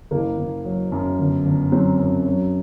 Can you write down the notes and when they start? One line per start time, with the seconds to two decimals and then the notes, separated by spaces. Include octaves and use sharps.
0.11 F#1 A#3
0.38 F#1
0.65 F#3
0.92 F#2
1.19 G1
1.46 G1
1.72 F#3 C4
1.99 F#2
2.26 F#3